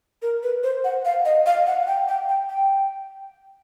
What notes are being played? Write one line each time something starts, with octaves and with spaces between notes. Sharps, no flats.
A#4
B4
C5
F#5
F5
D#5
F5
F#5
G5
G5
G5
G5